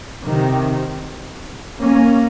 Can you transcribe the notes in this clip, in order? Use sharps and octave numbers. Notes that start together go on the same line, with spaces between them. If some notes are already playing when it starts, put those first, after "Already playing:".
C3 D#3
A#3 C#4